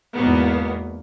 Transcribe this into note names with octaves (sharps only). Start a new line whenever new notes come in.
E2 G#2 B2 A#3 B3